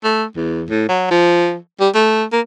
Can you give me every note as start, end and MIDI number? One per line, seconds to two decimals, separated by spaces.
0.04 0.25 57
0.36 0.64 40
0.70 0.85 45
0.89 1.08 54
1.11 1.56 53
1.80 1.89 55
1.95 2.24 57
2.32 2.41 58